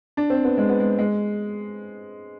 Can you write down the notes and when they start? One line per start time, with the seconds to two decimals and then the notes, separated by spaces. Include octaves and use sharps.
0.17 D4
0.30 C4
0.44 B3
0.57 G#3
0.69 B3
0.80 G#3
0.98 G#3